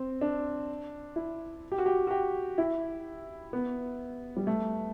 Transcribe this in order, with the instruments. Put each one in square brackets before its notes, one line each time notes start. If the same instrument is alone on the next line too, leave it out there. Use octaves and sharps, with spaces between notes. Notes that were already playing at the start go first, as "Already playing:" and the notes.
Already playing: [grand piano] C4
D4
E4
G4
F#4
G4
F#4
G4
E4
B3
G3
A3